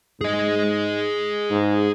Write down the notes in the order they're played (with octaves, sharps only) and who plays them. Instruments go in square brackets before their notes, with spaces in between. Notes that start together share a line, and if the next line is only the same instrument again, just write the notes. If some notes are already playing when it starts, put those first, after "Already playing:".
[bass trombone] G#2 [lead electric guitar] G#4 D#5
[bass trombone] G#2